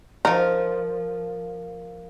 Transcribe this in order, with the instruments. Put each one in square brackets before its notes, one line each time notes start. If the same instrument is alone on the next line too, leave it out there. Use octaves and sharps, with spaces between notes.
[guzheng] F3 A#4 [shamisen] D#4